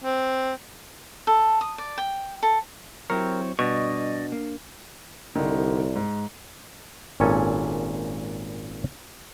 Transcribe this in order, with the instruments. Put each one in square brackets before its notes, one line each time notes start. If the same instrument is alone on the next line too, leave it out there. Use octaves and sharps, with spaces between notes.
[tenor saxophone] C4
[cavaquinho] A4
D#6
D5
G5
A4
[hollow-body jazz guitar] F#3 E4 G4 [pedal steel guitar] C4 C#5 [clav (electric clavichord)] A#4
[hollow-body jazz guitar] G2 [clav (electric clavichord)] B2 [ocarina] D4 [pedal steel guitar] D5 D#5 C#6
[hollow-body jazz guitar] A#3
[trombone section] C2 [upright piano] D3 D#3
[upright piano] G#2
[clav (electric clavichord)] G#1 A#2 C#4 A4 G#5